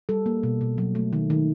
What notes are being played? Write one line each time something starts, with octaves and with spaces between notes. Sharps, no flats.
G3 A4
A#3
B2
B2
F#3
A3
D#3
D#3